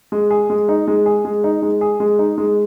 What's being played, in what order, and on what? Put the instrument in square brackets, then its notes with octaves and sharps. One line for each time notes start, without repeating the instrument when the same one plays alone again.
[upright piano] G#3
G#4
G#3
D#4
G#3
G#4
G#3
D#4
G#3
G#4
G#3
D#4
G#3